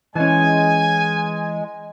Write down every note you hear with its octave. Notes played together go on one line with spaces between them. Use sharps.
E3 G#3 C#4 G#5